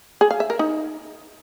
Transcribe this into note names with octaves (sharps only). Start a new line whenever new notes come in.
G#4
F5
E5
A#4
D#4